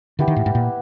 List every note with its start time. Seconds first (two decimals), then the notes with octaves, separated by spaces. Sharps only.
0.19 D3 B3 E4 G4 B4
0.28 D#3
0.36 A2
0.46 G#2
0.55 A#2